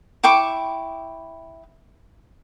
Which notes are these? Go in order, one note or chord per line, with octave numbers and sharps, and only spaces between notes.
E4 G5 C#6 D6